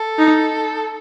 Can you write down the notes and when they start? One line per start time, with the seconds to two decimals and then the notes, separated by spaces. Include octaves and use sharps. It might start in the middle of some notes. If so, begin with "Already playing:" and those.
Already playing: A4
0.19 D#4